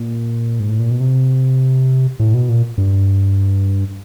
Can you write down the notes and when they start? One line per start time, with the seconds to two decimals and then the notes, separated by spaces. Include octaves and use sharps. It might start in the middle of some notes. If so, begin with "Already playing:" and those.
Already playing: A#2
0.60 G#2
0.69 A2
0.80 A#2
0.91 B2
1.00 C3
2.20 A2
2.34 B2
2.49 A#2
2.78 G2